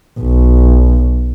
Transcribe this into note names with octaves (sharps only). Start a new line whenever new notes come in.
B1